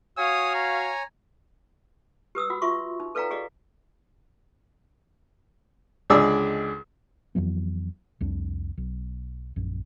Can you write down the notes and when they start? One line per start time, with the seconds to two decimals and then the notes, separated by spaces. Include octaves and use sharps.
0.17 F#4 C#5 F5 G#5 D#6
0.55 A#5
2.35 G4 B4 D#6 E6
2.50 F#4 F#5 B5
2.62 F4 F#4 E5 C6 C#6
3.00 D#4
3.15 A4 B4 D5 F5 G5 A#5
3.30 G4 G#4 D5 D#5 F5
6.10 C#2 D3 G#3 G#4 D5 E6
7.35 F2 E3 F#3 B3
8.21 C2 F2 D4
8.77 B1
9.56 A#1 F#2